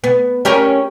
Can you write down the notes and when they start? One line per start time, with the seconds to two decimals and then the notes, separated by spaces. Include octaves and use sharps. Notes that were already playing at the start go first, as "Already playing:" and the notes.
0.04 B3
0.45 C#4 G4 A#4